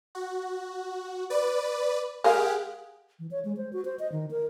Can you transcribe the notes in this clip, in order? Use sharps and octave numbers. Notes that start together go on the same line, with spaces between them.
F#4
B4 D5
G#3 G4 G#4 A#4 F5 F#5
E3
C#5
G#3
C5
F#4
C5
D#5
D#3
A#4